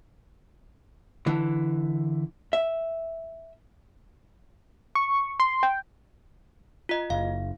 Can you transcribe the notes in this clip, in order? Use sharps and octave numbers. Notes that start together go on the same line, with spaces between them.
D3 E3
E5
C#6
C6
G5
F4 D#5
F#1 F5